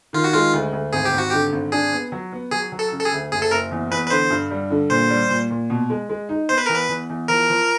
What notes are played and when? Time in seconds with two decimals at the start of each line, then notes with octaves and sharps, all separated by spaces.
0.13 D#3 F4
0.24 F#4
0.34 G#3 F4
0.53 D2
0.73 D2
0.93 G#1 G#4
1.05 G4
1.14 G#1 F#4
1.31 D3 G4
1.52 G#1
1.72 D4 G#4
1.92 B3
2.12 F#3
2.32 B3
2.51 F#3 G#4
2.72 F#3
2.79 A4
2.92 C#3
3.00 A4
3.05 G#4
3.12 D2
3.31 F#1 G#4
3.42 A4
3.51 F#1 A#4
3.71 E2
3.91 E2 B4
4.07 B4
4.10 D3 C5
4.30 G2
4.51 G3
4.70 D3
4.90 A#2 C5
5.10 G3
5.30 A#2
5.51 A#2
5.70 B2
5.90 G#3
6.09 G#3
6.29 D#4
6.49 B3 C5
6.58 B4
6.66 E2 A#4
6.75 B4
6.89 E2
7.09 E2
7.28 F3 A#4
7.49 F3